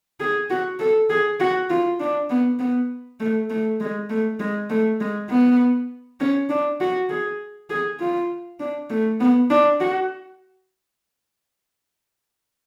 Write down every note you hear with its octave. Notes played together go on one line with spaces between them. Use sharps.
G#4
F#4
A4
G#4
F#4
F4
D4
B3
B3
A3
A3
G#3
A3
G#3
A3
G#3
B3
C#4
D4
F#4
G#4
G#4
F4
D4
A3
B3
D4
F#4